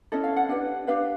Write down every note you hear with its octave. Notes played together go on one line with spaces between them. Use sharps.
C#4 E4 A4 D#5
F5
F#5
D4 G4 B4 F#5
D4 G4 B4 F5